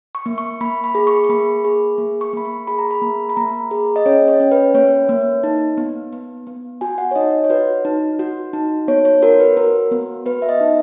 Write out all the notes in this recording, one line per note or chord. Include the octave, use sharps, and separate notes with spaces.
C#6
A#3
C#6
A#3 B5
B5
G#4
C#6
C#6
A#3 B5
G#4
A#3
C#6
A#3 B5
C#6
G#4 B5
A#5
B5
A#3
B5
A#3 A#5
G#4
D#5
C#4 C#5
C#5
C#4
B4
A#3 C#5
A#3
D#4
B3
B3
B3
F#4 G#5
F#5
C#5
D#4 D#5
C#5
F#4 B4
D#4
F#4
D#4
B3 C#5
C#5
F#4 A#4
B4
F#4 A#4
B3
B3 B4
E5
D#5
D#4